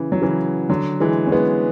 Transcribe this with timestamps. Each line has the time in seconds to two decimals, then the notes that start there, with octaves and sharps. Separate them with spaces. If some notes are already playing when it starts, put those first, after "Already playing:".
Already playing: C#3 E3
0.12 F#3
0.22 C#3 E3
0.69 D3 F#3
1.00 E3 G#3
1.27 C#4
1.32 G#3 B3